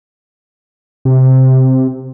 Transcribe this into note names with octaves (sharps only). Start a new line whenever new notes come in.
C3